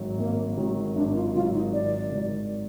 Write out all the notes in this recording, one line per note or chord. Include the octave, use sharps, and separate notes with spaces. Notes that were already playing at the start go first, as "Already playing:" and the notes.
Already playing: G#1 G#2 D#3 F#3
G#1 A#3
G#2 D#3 F#3
G#1 D4
F4
G#2 D#3 F#3 F4
D#4
G#1 D5
G#2 D#3 F#3